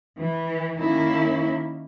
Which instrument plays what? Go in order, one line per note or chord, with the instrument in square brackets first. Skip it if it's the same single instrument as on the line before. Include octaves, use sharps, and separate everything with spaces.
[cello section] E3
D#3 A#3 C#4 E4